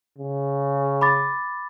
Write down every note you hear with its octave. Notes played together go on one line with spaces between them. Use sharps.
C#3
B5 D6 A6